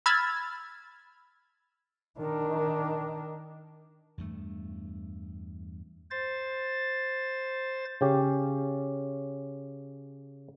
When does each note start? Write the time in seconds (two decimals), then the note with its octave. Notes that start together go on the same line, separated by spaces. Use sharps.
0.06 B5 E6 F6 G#6 A6
2.18 D#3 D4
4.18 E2 G2 A3
6.11 C5 A6
8.01 C#3 C#4 G4